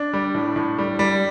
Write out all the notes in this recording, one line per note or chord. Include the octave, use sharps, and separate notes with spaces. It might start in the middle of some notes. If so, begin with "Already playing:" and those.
Already playing: D4
G3
A2
A2
G3
G3